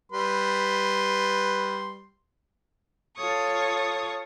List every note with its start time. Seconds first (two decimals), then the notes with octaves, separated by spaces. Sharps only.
0.12 G3 B4 C6
3.17 F4 A4 C#5 C#6 D#6